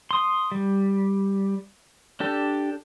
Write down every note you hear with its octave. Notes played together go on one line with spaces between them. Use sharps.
C6 D#6
G3
D4 G4 A4